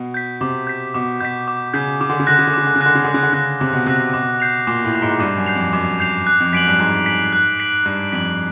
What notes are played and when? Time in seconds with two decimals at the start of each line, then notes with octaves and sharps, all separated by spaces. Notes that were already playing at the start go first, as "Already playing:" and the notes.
Already playing: B2
0.14 G6 B6
0.41 C3 D6
0.67 G6 B6
0.94 B2 D6
1.20 B2 G6 B6
1.48 D6
1.74 C#3 G6 B6
2.01 C#3 D6
2.09 D3
2.19 C#3
2.27 D3 F#6 A#6
2.39 C#3
2.47 D3
2.53 C#3 D6
2.67 D3
2.76 C#3
2.81 D3 F#6 A#6
2.95 C#3
3.04 D3 D6
3.14 C#3
3.23 D3
3.33 C#3 F#6 A#6
3.60 C3 D6
3.73 B2
3.86 C3 F#6 A#6
4.14 B2 D6
4.40 G6 C7 F7
4.67 A#2 D6
4.85 A2
4.93 G6 C7 F7
5.02 G#2
5.20 G2 D6
5.37 F#2
5.46 G6 C7 F7
5.55 F2
5.73 F#2 D6
6.00 G6 C7 F7
6.27 F#6
6.40 F2
6.53 F#2 B6 D7 F#7
6.67 G2
6.79 G#2 F#6
7.06 B6 D7 F#7
7.32 F#6
7.60 B6 D7 F#7
7.85 G2 F#6
8.12 F2 B6 D7 F#7